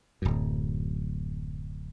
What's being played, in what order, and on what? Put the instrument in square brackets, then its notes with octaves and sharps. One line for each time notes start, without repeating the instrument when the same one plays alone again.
[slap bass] D1 F#2